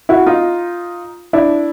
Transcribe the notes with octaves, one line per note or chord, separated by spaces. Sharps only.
E4 F#4
D#4 F4
D4 E4